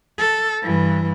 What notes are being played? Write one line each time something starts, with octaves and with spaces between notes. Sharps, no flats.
A4
G2 E3